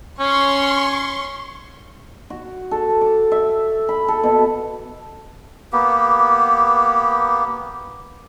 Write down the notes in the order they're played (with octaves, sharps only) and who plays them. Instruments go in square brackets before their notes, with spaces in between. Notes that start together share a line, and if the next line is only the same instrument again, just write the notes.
[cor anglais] C#4 [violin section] C6 C#6
[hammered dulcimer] F#4
A4
D6
E5
B5
A4
B2
[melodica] A#3 B3 G4